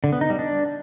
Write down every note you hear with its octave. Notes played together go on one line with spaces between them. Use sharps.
D3
B3
D#4
G3
D4